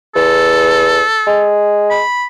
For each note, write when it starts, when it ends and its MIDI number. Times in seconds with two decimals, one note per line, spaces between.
0.16 1.01 40
0.16 1.54 69
1.27 1.99 56
1.90 2.26 83